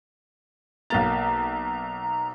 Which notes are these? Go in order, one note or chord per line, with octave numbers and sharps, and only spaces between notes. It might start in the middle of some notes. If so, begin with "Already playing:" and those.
B1 A#3 A#5 A6